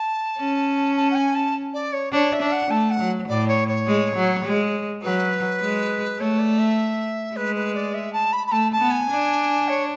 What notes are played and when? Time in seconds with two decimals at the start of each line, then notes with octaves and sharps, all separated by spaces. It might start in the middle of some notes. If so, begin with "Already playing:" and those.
Already playing: A5
0.38 C#4
0.96 A5
1.11 F#5
1.15 G#5
1.35 A5
1.73 D5
1.93 C#5
2.12 D4 C#5
2.32 E5
2.42 D4
2.52 F#5
2.71 A3 A5
2.90 F#5
3.00 F#3
3.28 A2 D5
3.48 C#5
3.68 C#5
3.87 G#3
4.16 F#3
4.45 G#3
5.03 F#3 B4
5.61 G#3
6.19 A3 C#5
6.39 D5
6.58 E5
7.35 G#3 B4
7.55 B4
7.75 D5
7.94 E5
8.13 A5
8.32 B5
8.47 B5
8.51 A3 A5
8.72 A5
8.81 B3
8.91 G#5
9.10 D4
9.68 C#5